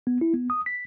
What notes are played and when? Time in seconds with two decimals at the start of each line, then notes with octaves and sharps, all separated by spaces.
0.07 B3
0.21 E4
0.34 B3
0.50 D#6
0.66 B6